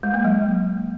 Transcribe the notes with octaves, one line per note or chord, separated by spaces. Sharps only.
G#3
A#3
F#3